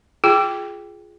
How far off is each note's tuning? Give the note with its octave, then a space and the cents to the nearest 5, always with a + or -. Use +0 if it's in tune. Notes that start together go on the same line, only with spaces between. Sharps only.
F4 +0 G#4 +0 G5 +0